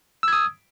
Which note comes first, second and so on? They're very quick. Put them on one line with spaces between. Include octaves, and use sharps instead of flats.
E6 G#6 D#6